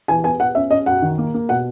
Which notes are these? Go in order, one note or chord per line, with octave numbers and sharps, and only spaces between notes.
E3 G#5
B3 G#5
B3 F#5
C#4 E5
C#4 D#5
F#2 F#5
D#3
A#3
A#3
B2 F#5